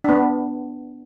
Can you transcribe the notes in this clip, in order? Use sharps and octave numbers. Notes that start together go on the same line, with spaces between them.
B3 D4